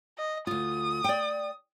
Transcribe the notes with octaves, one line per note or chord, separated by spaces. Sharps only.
D#5
D2 F4 D#6
D5 G5